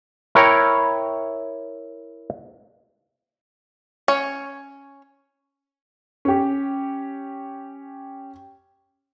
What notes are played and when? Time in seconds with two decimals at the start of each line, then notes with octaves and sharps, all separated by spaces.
0.35 E4 A#4 C#5 G5 A#5
4.08 C#4 C#5
6.25 C#4 G4